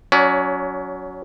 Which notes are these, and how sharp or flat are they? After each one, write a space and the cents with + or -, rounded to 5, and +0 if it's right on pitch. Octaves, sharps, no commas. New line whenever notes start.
F#3 +0 C#4 +25 D5 +10